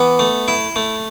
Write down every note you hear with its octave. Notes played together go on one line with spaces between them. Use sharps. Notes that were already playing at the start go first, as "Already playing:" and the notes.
Already playing: E3 B3
A3
E4
A3